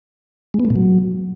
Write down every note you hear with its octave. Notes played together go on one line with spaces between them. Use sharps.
G#3
B3
A3
A#2
F#3